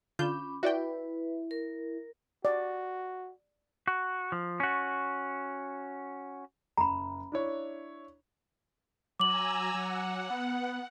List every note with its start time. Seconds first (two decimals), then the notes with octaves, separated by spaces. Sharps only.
0.19 D3 C#4 F4 B5 D6 G6
0.63 E4 F#4 B4 D5 G5
1.51 A#4
2.45 F#4 D5
3.88 F#4
4.32 F3
4.60 C#4 F#4
6.77 F#1 A#5 B5
7.32 D4 E4 C#5
9.20 F#3 G#5 A#5 D6 E6 F#7
9.74 F#3 F#5
10.30 B3